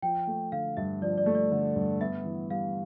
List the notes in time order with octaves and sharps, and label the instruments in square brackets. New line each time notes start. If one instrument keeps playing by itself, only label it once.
[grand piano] F3 [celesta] G5
[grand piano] A3
[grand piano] D3 [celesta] F5
[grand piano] G2 [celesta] E5
[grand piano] F3 [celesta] D5
[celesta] D5
[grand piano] A3
[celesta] D5
[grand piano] D3
G2
[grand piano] B3 [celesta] E5
[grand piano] E3
[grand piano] G3 [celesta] F5